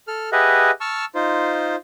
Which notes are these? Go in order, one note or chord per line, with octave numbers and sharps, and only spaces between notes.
A4 F6
G4 G#4 B4 D#5 E5 F#5
A5 C#6 E6 F6
D#4 F4 C5